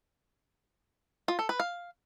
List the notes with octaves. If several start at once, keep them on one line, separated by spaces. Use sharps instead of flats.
F4
A4
B4
F5